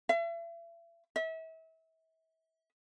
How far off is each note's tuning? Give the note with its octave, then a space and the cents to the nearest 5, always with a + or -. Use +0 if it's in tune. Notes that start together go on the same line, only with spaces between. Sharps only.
E5 +40
E5 -35